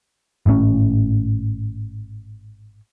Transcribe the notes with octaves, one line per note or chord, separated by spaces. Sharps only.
G#1 A2 C#3 C#4